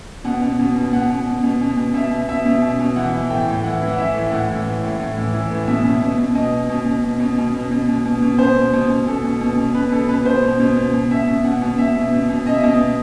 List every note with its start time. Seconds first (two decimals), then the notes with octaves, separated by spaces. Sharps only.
0.24 B2 F#5
0.42 B2
0.59 B2
0.75 B2
0.93 B2 F#5
1.10 B2
1.26 B2
1.43 B2
1.61 B2
1.77 B2
1.94 B2 E5
2.11 B2
2.28 B2 E5
2.46 B2
2.62 B2
2.80 B2
2.96 E3 F#5
3.14 E3
3.30 A2 G5
3.47 A2
3.64 E3 F#5
3.81 E3
3.88 F#5
3.98 E3 E5
4.14 A2
4.31 A2 F#5
4.49 E3
4.66 A2
4.83 A2
5.00 A2
5.17 E3
5.34 E3
5.50 A2
5.67 B2 E5
5.84 B2
6.02 B2
6.18 B2
6.35 B2 D#5
6.52 B2
6.69 B2
6.86 B2
7.03 B2
7.20 B2
7.38 B2
7.54 B2
7.71 B2
7.88 B2
8.05 B2
8.22 B2
8.38 B2 C5
8.56 B2
8.73 B2
8.90 B2
9.07 B2 A4
9.24 B2
9.41 B2
9.57 B2
9.75 B2 B4
9.92 B2 A4
10.09 B2 B4
10.25 B2 C5
10.43 B2
10.60 B2
10.77 B2
10.93 B2
11.11 B2 E5
11.27 B2
11.44 B2 F#5
11.62 B2
11.78 B2 E5
11.96 B2
12.12 B2
12.29 B2
12.46 B2 D#5
12.53 E5
12.60 B2 D#5
12.80 B2